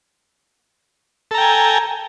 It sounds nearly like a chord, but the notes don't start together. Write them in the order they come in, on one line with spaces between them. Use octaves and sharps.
A4 A#5 G5 G#5